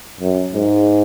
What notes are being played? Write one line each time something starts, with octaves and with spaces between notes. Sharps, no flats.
F#2
G#2